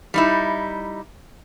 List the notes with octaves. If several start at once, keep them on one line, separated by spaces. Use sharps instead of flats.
G3 D#4 E4